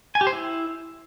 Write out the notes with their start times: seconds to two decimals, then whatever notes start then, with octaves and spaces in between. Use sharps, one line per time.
0.15 G#5
0.21 G4
0.27 C5
0.32 E4